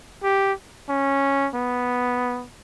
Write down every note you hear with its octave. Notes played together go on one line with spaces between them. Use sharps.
G4
C#4
B3